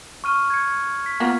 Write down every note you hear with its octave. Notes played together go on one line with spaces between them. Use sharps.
C#6 F6 D#7
G#6 C#7
B6
A#3 B3 F4